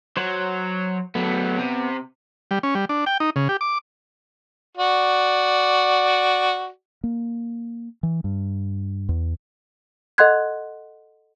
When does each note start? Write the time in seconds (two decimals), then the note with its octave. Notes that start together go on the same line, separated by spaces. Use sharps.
0.17 F#3 C5 C#5 F#5
1.15 F#3 A3 B3
1.58 C3
2.51 G3
2.63 C#4
2.75 G3
2.89 D4
3.06 G5
3.20 D#4
3.36 C#3
3.49 G4
3.61 D6
4.78 F#4 D5
7.04 A#3
8.03 E3
8.24 G2
9.09 E2
10.18 A4 D#5 F#5 C6 F#6 G#6